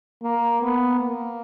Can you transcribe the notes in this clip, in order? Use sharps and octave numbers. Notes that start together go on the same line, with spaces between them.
A#3
B3
A#3